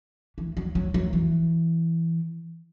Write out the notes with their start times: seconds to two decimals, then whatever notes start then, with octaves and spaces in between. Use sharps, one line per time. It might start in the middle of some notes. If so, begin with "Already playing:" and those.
0.38 E3
0.57 F#3
0.75 F#3
0.94 F#3
1.13 E3